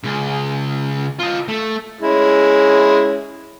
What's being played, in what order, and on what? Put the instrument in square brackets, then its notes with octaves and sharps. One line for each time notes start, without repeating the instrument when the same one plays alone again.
[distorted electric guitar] C#2 C#3
F4 D#5
A3
[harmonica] G#3 C#4 E4